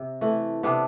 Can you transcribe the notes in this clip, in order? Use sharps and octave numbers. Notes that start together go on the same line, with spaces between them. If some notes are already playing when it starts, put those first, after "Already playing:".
Already playing: C3
E3 A3
C3 B3 D4